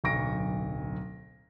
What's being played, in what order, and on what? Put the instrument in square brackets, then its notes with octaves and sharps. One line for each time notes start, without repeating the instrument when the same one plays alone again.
[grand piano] D1 B1 C#6 A#6 D7